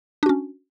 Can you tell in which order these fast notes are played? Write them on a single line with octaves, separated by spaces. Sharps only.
D4 F#4 C#4